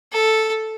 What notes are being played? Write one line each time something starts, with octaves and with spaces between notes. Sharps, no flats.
A4